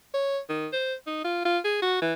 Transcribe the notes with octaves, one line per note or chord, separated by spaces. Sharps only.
C#5
D#3
C5
D#4
F4
F4
G#4
F#4
E3